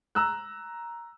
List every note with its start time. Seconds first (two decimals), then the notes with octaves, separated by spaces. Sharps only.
0.15 A#5 E6 F#6